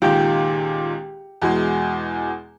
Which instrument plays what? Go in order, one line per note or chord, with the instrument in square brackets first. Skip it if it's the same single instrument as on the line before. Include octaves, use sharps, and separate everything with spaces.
[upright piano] C#2 A#2 D#3 [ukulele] G4
[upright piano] E2 B2 G#3